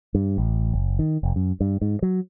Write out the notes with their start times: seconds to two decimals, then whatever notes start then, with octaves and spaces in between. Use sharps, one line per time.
0.15 G2
0.38 A1
0.73 F#1
0.99 D#3
1.23 F1
1.36 F#2
1.61 G2
1.81 G#2
2.02 F#3